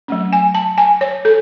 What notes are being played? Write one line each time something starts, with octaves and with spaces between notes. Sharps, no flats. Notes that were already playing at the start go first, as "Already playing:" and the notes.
F#3 A3 C#4
G#5
A5
G#5
C#5
A4